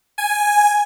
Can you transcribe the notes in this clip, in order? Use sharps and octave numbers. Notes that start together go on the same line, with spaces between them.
G#5